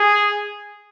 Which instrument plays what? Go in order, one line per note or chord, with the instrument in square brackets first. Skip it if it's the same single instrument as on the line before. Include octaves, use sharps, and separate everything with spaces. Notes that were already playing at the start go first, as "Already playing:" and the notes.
Already playing: [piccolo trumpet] G#4